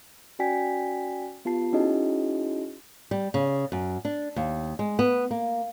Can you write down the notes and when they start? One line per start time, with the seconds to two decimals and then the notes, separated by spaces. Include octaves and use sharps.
0.39 C#4 F#4 D5 G5 G#5 B6
1.45 B3 F4 G4 A5 C7
1.73 C#4 D#4 E4 F#4 G#4 D#5
3.11 G3
3.34 C#3
3.72 F#2
4.05 D4
4.36 D#2
4.79 G#3
4.99 B3
5.31 A#3